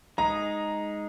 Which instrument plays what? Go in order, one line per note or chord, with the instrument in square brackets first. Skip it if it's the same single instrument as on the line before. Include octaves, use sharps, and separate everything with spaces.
[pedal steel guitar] G#3 D#4 G#4 [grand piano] A#5